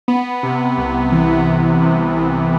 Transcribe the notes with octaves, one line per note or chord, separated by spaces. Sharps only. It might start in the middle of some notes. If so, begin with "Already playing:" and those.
B3
C3
C2
E3
B3
C3
C2